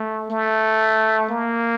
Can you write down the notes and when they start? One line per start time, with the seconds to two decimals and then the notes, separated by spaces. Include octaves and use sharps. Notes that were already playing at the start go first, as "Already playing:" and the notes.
Already playing: A3
0.31 A3
1.30 A#3